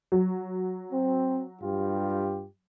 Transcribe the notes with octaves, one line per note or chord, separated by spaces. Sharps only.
F#3
C4
G2 F4 G4